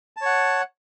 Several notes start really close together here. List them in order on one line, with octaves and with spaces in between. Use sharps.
A5 C#5 F#5